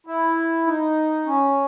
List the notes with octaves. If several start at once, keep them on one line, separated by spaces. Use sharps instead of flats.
E4
D#4
C#4